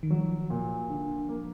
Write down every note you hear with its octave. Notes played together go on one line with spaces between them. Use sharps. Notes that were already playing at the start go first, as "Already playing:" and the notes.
D#3
F3 F#3
A#2
D3
A#3